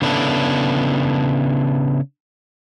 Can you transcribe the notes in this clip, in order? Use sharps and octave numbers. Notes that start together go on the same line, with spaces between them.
C#3 B3 D4 E4 A4